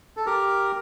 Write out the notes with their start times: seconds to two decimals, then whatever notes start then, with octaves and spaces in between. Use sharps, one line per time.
0.17 A4
0.26 G4 A#4